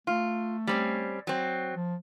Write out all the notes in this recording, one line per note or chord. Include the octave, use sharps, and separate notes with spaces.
A3 F4
G3 C4 C#4
F#3 C4
F3